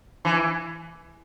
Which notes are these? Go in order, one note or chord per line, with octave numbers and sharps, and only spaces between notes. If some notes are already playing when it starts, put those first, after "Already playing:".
E3